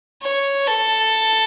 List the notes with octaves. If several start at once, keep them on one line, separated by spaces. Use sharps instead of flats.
C#5
A4